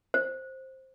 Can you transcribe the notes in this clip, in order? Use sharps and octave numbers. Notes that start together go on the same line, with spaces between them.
C5